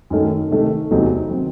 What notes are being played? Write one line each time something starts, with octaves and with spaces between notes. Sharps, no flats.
F#2 D#3 A3
C3 D#3 A3
E2 C3 F#3 A3 D#4
D#3 F#3 C4 D#4